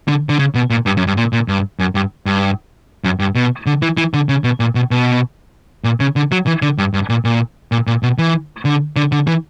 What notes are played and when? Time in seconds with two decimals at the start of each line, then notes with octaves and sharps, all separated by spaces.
0.08 D3
0.29 D3
0.39 C#3
0.55 B2
0.70 A#2
0.86 G2
0.97 F#2
1.07 G2
1.17 A#2
1.33 A#2
1.48 G2
1.79 F#2
1.95 G2
2.26 G2
3.04 F#2
3.20 G2
3.35 B2
3.66 D3
3.82 E3
3.97 E3
4.14 D3
4.29 C#3
4.44 B2
4.60 A#2
4.75 B2
4.91 B2
5.84 A#2
6.00 C#3
6.16 D3
6.32 F#3
6.47 E3
6.62 D3
6.78 G2
6.94 G2
7.10 A#2
7.25 A#2
7.72 A#2
7.87 A#2
8.03 B2
8.18 E3
8.65 D3
8.96 D3
9.12 D3
9.27 E3